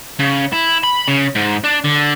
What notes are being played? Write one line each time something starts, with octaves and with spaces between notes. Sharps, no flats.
C#3
E4
B5
C#3
G#2
D4
D3